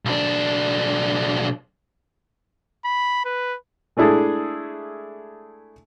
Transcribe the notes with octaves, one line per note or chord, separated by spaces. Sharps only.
B1 D4
B5
B4
G#3 A3 D4 E4 G#4 A4